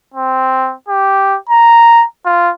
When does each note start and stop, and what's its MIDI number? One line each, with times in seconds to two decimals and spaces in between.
0.14 0.74 60
0.89 1.37 67
1.49 2.05 82
2.26 2.51 65